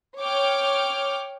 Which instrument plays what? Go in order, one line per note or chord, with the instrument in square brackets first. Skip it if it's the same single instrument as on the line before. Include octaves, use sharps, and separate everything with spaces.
[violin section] C#5 G5 D6 F6